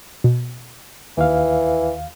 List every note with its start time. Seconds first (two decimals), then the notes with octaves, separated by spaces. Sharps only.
0.24 B2
1.17 D#2 E3 F5